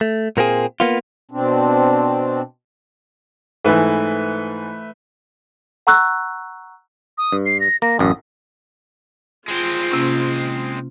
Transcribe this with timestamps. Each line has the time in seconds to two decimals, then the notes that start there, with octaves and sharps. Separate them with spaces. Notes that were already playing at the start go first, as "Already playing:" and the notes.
0.01 A3
0.37 A#2 A#3 C4 G#4
0.80 A#3 B3 F4
1.31 B2 C4 D4
3.64 G#2 E3 A3 B4
5.87 F#5 A#5 C#6 E6 F#6
7.18 D#6
7.32 G2
7.46 C7
7.60 A#6
7.82 A#3 A#6
7.99 A1 F#2 D#6
9.48 G#3 C4 F4
9.91 C3 A#3 C#4